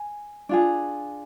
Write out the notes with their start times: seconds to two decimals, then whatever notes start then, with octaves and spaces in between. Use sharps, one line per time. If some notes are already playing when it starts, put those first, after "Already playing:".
Already playing: G#5
0.49 D4 F4 G#4